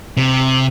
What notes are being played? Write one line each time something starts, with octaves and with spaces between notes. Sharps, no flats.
C3